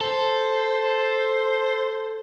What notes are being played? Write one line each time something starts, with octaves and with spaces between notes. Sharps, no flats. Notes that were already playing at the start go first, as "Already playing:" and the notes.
A4 C5